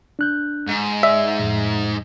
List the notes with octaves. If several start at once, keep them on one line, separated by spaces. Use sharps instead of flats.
D4 F#6 G6
G#2
D5 E5
F2 A2